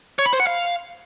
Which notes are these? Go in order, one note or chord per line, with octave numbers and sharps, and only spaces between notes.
C#5
B5
C5
F#5
F5